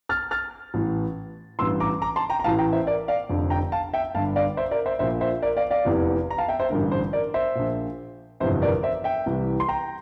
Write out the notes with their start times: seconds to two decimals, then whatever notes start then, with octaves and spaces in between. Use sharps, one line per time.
0.09 F6 A6
0.31 F6 A6
0.74 A1 A2 E3
1.59 A1 G2 E3 C6 E6
1.80 A#5 D6
2.02 A#5 D6
2.16 A5 C6
2.30 G5 A#5
2.40 A#5
2.44 A1 A2 E3 F5 A5
2.58 G5 A#5
2.73 C5 E5
2.87 A#4 D5
3.08 D5 F5
3.29 F1 F2 D3
3.50 G5 A#5
3.72 F5 A5
3.93 E5 G5
4.15 G1 G2 D3 F5 A5
4.36 D5 F5
4.57 C5 E5
4.71 A#4 D5
4.86 C5 E5
4.99 A#1 C5 E5
5.02 A#2
5.21 C5 E5
5.42 A#4 D5
5.57 D5 F5
5.71 D5 F5
5.85 F1 E2 C3 E3
6.31 A#5
6.38 F5 A5
6.48 E5 G5
6.59 C5 E5
6.70 A1 G2 D3 A#4
6.92 C5
7.13 A#4 D5
7.34 C5 E5
7.55 A#1 A#2
8.40 G1 F2 C3 E3 C5 E5
8.62 A#4 D5
8.83 C5 E5
9.04 E5 G5
9.26 C2 C3 E3
9.60 C6
9.68 G5 A#5